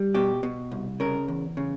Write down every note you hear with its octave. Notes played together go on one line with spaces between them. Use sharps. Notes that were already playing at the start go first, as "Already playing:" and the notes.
Already playing: G3
B2 G4
B2
C2
C#3 A#4
E2
C#3